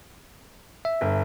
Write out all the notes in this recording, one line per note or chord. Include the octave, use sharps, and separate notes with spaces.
E5
G1